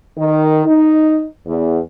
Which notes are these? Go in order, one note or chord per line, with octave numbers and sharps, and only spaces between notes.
D#3
D#4
E2